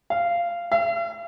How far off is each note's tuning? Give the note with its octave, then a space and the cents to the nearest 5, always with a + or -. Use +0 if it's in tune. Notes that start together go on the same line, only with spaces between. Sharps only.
F5 -15
F5 -45